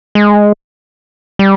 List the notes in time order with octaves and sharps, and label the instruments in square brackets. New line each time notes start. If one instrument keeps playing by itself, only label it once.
[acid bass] G#3
G3